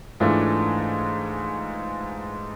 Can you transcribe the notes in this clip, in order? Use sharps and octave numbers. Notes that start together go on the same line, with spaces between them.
G#2 E3 A3 D4 F4